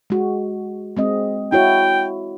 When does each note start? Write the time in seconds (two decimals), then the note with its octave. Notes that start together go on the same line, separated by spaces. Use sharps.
0.10 G#3 F#4
0.97 G#3 C4 D#5
1.52 E4 F#4 C#5 G5